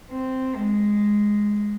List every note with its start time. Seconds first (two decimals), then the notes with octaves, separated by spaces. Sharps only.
0.11 C4
0.56 G#3